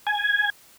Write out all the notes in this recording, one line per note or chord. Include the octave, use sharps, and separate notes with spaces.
G#5